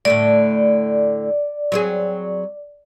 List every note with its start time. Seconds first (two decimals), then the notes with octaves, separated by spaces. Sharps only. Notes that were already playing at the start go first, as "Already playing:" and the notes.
0.05 A2 D3 A3 D5
1.72 F#3 C4 G#4